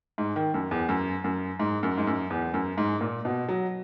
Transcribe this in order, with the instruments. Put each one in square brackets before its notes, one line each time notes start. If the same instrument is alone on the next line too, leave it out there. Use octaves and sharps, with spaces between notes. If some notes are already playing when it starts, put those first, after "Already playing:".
[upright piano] G#2
D#3
F#2
E2
F#2
F#2
G#2
F#2
G#2
F#2
E2
F#2
G#2
A#2
B2
F#3